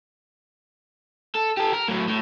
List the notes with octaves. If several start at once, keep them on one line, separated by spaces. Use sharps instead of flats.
A4
G4 A4
A#4
A2 F#3
A2